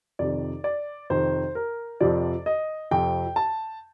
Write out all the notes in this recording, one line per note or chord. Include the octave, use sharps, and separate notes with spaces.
F2 C3 D#3 D5
D5
F2 C3 D#3 C5
A#4
F2 C3 F3 D5
D#5
F2 C3 F3 G5
A5